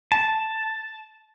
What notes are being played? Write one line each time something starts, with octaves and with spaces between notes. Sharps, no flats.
A5